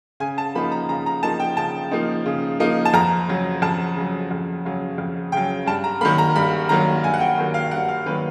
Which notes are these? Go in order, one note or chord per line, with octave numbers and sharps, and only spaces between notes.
C#3 G#5
A5
F3 A#3 D#4 B5
A#5
C#3 A#5
A#5
F3 A#3 D#4 A5
G5
C#3 A5
F3 A#3 D#4
C#3
F3 A#3 D#4
A5
F2 A#5
C#3 F#3
F2 A5
C#3 F#3
F2
C#3 F#3
F2
C#3 F#3 G5
G2 A5
A#5
D#3 F#3 A#3 B5
A#5
G2 B5
D#3 F#3 A#3 A#5
G2 G#5
F#5
G5
D#3 F#3 A#3
F5
G2 F#5
F5
D#3 F#3 A#3 B4